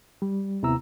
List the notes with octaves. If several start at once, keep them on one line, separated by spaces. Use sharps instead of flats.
G3
D#2 C3 B3 E4 A#5 E6